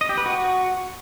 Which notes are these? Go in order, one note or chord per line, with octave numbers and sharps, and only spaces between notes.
D#5
G4
B4
F#4